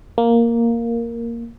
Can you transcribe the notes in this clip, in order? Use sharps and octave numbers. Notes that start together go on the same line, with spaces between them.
A#3